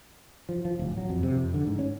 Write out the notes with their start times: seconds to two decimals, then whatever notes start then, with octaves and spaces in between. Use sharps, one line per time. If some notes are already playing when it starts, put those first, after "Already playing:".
0.49 F3
0.65 F3
0.79 D1
0.97 F#3
1.09 F2
1.23 C3
1.35 F2
1.54 D3
1.67 G#2
1.79 C#4